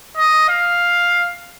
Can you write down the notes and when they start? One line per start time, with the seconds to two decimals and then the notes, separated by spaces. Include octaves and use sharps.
0.17 D#5
0.49 F5